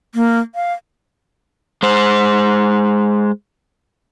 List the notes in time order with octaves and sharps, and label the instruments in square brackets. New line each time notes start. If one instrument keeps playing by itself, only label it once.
[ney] A#3
F5
[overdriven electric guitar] G#3 C5